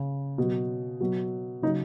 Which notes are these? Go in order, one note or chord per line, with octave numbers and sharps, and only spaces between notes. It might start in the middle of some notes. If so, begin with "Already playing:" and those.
Already playing: C#3
B2 F#3
B2 F#3
C#3 F#3 D#4